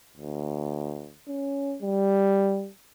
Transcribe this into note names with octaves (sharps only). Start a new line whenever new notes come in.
D2
C#4
G3